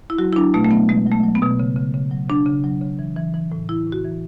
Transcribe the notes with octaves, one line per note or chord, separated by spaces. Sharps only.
E4
F#3 F#4
E4
F#3 D4
B2 A3
A3
F#3 B3
B2 G#3
F#3
A3
F#3
B3
B2
C#3
C#3
C#3
F#3
C#3 D4
C#3
F#3
C#3
E3
E3
E3
A2
E3 E4
A2
F#4
E3